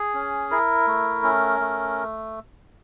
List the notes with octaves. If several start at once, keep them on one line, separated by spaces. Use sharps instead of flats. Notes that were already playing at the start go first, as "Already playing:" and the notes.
Already playing: G#4
C#4
E4 A#4
A3
C#4
A3